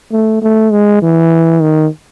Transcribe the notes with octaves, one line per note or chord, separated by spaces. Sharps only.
A3
A3
G#3
E3
D#3